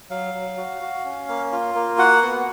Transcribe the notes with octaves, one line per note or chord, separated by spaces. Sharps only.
F#3 F5
F#3
F#4
F#4
C#4
A#3
F4
A#3
F#4 F#5
B3